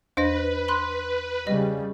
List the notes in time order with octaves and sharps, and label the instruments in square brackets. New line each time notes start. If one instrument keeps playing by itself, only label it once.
[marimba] E2 D4 [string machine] B4 [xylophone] C5 D#5 A#6
[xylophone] B5 C6 F#6
[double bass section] C#3 G3 [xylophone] D#5